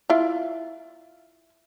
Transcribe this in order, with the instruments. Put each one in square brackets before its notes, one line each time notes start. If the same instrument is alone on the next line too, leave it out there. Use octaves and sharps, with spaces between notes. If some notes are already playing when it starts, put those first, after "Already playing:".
[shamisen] E4 F4